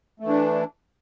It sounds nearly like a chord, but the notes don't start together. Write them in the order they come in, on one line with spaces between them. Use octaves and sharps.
A3 E3 D4